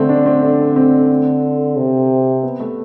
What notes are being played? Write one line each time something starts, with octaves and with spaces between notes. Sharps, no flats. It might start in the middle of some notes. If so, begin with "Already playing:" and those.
Already playing: D3 A3 C4
D4
C4
D4
C4
C3
B3
A3